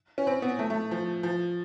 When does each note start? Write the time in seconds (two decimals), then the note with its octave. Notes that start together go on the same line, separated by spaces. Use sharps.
0.18 C#4
0.27 C4
0.42 B3
0.59 A3
0.70 A3
0.91 F3
1.23 F3